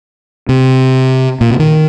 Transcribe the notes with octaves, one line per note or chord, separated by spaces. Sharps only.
C3
A#2
C3
D#3